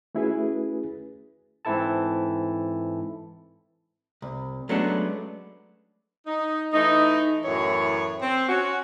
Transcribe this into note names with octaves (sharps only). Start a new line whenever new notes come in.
A3 C#4 E4 F#4 G#4 B4
G#2 E3 C4 E4 A4 A5
C2
F#3 G#3 A3 B3 C#4 D4
D#4
E3 A3 D#4
F#2 A2 E3 C#5
C4
C#4 F#4